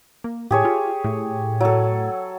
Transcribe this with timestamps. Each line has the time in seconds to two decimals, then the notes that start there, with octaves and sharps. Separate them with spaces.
0.24 A#3
0.51 A2 G4 G#4 C#5
0.65 F4
1.04 A2
1.61 F#3 A4